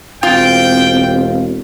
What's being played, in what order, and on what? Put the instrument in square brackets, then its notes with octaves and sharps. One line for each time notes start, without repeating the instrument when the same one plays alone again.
[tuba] E1 [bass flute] C4 [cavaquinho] F4 [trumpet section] G5